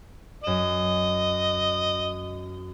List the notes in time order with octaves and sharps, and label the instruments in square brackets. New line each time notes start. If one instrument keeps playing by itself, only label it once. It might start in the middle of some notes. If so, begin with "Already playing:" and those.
[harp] F#2 E7 [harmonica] D#5